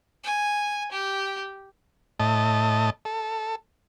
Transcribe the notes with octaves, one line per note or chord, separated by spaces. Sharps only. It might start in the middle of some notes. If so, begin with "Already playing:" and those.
G#5
G4
A2 D#5 A5
A4